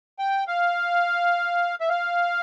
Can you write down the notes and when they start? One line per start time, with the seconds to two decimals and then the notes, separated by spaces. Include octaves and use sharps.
0.19 G5
0.47 F5
1.81 E5
1.89 F5